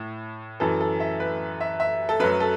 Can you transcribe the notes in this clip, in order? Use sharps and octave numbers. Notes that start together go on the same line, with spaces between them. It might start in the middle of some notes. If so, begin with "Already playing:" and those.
Already playing: A2
F#2 E3 A4
A4
E5
B4
E5
E5
A4
F#2 F#3 B4
A4